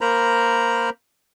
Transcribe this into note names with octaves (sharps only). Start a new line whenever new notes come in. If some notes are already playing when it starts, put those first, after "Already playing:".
A#3 A#4 C5 A#5 B5